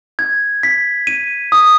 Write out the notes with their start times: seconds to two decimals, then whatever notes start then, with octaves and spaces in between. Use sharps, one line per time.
0.19 G#6
0.63 B6
1.07 D#7
1.52 D#6